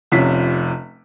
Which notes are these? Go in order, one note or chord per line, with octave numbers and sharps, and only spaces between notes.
F1 C3 F3 C#4 B6